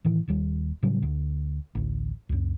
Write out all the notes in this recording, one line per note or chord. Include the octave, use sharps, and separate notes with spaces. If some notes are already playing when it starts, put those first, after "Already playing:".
A2 D#3 E3
D#1 D#2 G3
A2 C#3 F#3 G3
D2
A1 D2
C#2 F#2